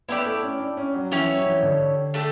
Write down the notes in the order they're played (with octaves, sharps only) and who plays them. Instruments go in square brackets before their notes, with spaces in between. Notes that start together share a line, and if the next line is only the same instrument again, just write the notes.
[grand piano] B3 [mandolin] E4 G4 D5
[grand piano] A3
C#4
D4
C#4
F#3
[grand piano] E3 [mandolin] C#4 E4 G4 C#5
[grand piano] F#3
E3
D3
[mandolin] A3 D4 G4